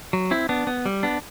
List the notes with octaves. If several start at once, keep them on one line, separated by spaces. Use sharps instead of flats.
F#3
C4 E4
B3 D4
B3
G3
B3 D4